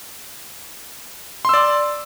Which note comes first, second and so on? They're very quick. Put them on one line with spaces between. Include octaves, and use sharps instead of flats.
C6 E6 D5